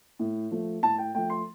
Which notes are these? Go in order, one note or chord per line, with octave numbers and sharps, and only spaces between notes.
A2
F3 A3
A2 A5
G5
F3 A3 G5
C6